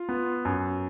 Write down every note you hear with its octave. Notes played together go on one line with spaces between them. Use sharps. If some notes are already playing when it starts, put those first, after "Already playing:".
Already playing: F4
B3
F#2